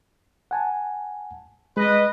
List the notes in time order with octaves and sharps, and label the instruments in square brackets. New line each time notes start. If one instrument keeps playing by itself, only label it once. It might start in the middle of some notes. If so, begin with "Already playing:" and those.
[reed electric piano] F#5 G#5 A5
[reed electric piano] G#3 [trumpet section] B4 D#5